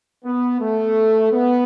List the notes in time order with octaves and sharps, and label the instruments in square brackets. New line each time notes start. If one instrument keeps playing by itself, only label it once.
[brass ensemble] B3
A3
B3